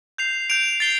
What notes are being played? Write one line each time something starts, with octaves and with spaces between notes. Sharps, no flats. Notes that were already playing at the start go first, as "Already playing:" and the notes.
G6 C7 F7
G6 D7 F7
A6 C7 G7